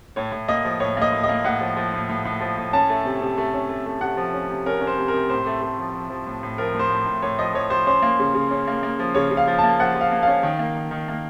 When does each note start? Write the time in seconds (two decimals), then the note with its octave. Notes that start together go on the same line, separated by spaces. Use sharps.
0.16 A2 C#5
0.32 A2
0.48 A#3 D#5
0.65 F3
0.80 A2 C#5
0.97 A#3 D#5
1.12 A2
1.24 D#5
1.29 A#3
1.44 A2 F#5
1.61 F3
1.77 F3
1.94 A2
2.09 A2
2.25 A2
2.40 F3
2.58 A2
2.73 C#4 A5
2.90 A3
3.05 C3
3.22 C3
3.38 A3
3.54 C#4
3.69 A3
3.86 A3
4.01 C3 F#5
4.17 F3
4.34 C#4
4.50 C3
4.66 C#4 A#4
4.81 C#4
4.87 C5
4.98 C3
5.08 A#4
5.14 C3
5.30 A2 C5
5.47 A3
5.62 A3
5.79 F3
5.95 F3
6.10 F3
6.26 A2
6.43 A2
6.58 F3 A#4
6.74 A2 C5
6.90 A2
7.06 A2
7.22 A2 C#5
7.39 F3 D#5
7.54 F3 C#5
7.70 F3 C5
7.87 C#4 C5
8.02 A#3
8.19 C#3
8.34 C#3
8.51 C#4
8.67 A#3
8.83 A#3
8.99 F3
9.15 C#3 C#5
9.31 C#3
9.37 F5
9.47 F3
9.59 A#3 A5
9.79 F3 F#5
9.95 F3
10.01 F5
10.12 A#3
10.23 C#4 F5
10.43 D#3
10.59 A#3
10.76 D#3
10.91 D#3
11.08 A#3